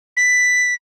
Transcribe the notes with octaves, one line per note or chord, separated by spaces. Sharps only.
B6